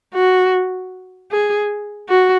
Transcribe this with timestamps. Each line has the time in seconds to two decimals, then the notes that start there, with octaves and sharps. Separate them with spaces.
0.14 F#4
1.31 G#4
2.09 F#4